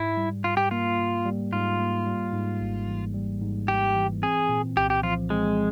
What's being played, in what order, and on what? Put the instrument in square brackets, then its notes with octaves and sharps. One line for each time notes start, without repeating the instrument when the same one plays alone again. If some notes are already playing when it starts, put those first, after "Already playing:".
Already playing: [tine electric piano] G#2 [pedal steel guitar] E4
[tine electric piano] G3
[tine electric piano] G#2 [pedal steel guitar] F4
[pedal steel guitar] G4
[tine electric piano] A#3 [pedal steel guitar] F4
[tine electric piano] G#2
G3
[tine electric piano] G#2 [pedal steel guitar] F4
[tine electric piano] A#3
G3
G#2
G#1
E3
G3
G#2
[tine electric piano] G#1 [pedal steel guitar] G4
[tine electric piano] E3
[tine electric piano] C4 [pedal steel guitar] G#4
[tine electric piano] A#2
[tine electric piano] C2 [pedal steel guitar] G4
[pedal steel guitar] G4
[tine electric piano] F3 [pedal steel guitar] F4
[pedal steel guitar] G#3 [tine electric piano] C4